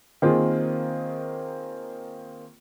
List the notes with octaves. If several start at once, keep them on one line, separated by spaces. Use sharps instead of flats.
D#3 A#3 C4 F4 G#4